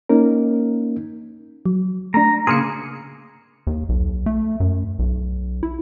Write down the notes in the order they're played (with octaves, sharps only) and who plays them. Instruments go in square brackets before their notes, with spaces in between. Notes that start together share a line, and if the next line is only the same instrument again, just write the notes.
[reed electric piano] A#3 C#4 D#4 A#4
[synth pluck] F#3
[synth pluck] A3 D4 [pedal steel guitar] A#5
[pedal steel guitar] C#3 A#3 G#4 [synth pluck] C6 F6 C#7
[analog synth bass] D#2
B1
A3
F#2
B1
E4